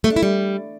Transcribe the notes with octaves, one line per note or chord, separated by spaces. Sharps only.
A3
D4
E4
G3